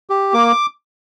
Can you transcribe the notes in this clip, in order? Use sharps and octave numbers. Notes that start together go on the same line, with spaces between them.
G4
A#3 D6